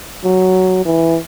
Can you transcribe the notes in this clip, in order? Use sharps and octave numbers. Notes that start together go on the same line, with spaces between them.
F#3
E3